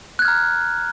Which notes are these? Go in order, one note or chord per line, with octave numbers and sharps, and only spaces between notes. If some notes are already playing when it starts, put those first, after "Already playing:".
A#5 F6 F#6 G#6